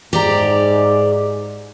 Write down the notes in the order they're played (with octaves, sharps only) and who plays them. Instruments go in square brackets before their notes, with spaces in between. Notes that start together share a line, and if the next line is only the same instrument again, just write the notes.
[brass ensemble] G#2 [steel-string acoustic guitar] G4 D5 A#5